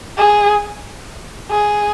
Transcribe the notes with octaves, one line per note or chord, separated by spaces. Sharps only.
G#4
G#4